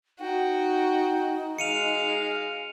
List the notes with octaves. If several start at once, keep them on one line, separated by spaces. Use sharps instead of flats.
D#4 F#4 G5
G#3 F5 C#7 D#7 F7